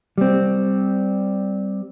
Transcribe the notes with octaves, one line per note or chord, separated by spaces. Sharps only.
G3 C4